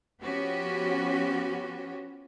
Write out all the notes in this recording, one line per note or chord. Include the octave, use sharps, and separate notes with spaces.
F3 B3 C#4 F#4 G4